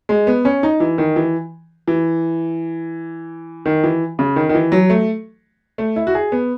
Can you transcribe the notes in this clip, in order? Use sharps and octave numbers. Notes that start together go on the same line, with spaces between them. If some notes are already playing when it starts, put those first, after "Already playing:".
G#3
B3
C#4
D#4
E3
D#3
E3
E3
D#3
E3
C#3
D#3
D#3
E3
F#3
A3
A3
E4
F#4
G#4
B3